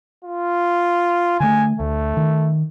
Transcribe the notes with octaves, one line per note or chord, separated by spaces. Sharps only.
F4
D3 A3 G#5
D2 A3
D#3